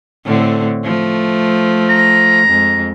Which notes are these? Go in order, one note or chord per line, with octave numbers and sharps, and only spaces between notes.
A2 D3 C4
F3 A3
A#5
F2 G#3